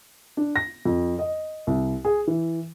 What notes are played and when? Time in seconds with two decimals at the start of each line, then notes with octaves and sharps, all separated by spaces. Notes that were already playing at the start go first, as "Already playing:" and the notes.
0.37 D4
0.56 A#6
0.85 F2
1.19 D#5
1.67 C2
2.05 G#4
2.27 E3